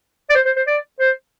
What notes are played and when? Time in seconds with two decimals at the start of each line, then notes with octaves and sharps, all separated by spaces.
0.30 D5
0.35 C5
0.46 C5
0.56 C5
0.67 D5
1.00 C5